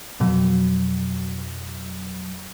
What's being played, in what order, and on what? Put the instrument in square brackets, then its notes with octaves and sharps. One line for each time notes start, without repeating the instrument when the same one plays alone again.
[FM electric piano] F2 B2 F#3